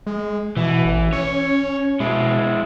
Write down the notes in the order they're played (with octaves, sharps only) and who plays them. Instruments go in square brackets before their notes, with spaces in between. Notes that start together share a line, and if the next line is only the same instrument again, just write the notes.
[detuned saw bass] G#3
[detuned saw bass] B2 [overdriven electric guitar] E3
[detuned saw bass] A1
[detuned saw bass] C#4 [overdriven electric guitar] C#5
[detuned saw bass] B2 [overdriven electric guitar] G#3 E4